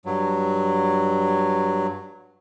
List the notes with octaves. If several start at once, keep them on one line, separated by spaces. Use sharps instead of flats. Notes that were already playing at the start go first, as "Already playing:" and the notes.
G2 F#3